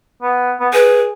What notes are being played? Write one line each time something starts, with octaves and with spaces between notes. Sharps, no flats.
B3
B3
G#4 B4